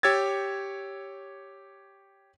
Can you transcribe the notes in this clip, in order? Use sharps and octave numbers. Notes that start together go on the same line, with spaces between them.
G4 C#5 E6 G#6 A6